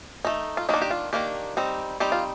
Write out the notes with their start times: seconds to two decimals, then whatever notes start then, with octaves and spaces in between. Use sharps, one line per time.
0.25 A3 D#4
0.57 F4
0.69 D#3 A#3 D4 D#4
0.82 G4
0.91 F4
1.13 D#3 A#3 D4 G4
1.57 G3 C4 D#4
2.00 G3 C4 D#4 G4
2.12 F4